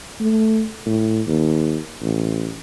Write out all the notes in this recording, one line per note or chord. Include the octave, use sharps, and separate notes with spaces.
A3
A2
D#2
A1